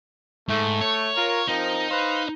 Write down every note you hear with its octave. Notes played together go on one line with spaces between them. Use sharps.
G#2 A3
C#5
F4 A#4
F3 C4 D#4 A#4
B4 C5 F5